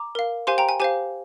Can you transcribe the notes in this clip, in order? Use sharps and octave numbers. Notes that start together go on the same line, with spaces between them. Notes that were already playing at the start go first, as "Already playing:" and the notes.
Already playing: A#5 D6
A#4 F5
G4 C5 F5 G#5 C6
G5 A#5
G#5
G4 C5 F5 G#5